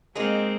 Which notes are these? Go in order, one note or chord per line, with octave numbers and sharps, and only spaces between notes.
G#3 A#3 C4 D#4 G#4